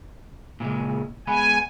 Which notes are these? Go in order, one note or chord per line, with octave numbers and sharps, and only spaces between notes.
A#2 C#3 G#3
G#3 B3 B4 G#5